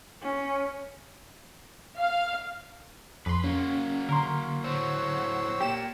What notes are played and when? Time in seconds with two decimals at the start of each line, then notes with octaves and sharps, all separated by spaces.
0.21 C#4
1.97 F5
3.26 F2 B4 C6
3.44 F#3 A#3 C#4
4.09 D3 A#4 C6
4.64 A2 F#3 C5 C#5 E6
5.60 A#2 G4 E7